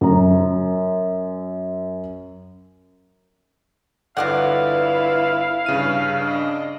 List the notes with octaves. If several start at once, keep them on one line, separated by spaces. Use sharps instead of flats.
F#2 A#5
G1 E4 F#4 A4 B4 D5 F5 F#5
G2 C#3 D#7
D4 D#5